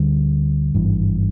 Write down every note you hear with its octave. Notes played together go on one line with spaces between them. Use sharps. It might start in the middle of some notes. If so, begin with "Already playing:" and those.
Already playing: D2 D3 G3
G#1 G2 E3